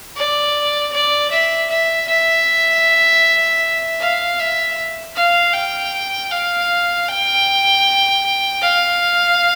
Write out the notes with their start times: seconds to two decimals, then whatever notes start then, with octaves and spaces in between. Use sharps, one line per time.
0.16 D5
0.92 D5
1.31 E5
1.69 E5
2.07 E5
4.00 F5
4.39 E5
5.15 F5
5.54 G5
6.31 F5
7.08 G5
8.61 F5